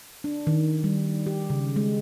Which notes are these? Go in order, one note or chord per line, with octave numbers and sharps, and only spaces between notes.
D4
D#3
G3
G4
C#3
G#3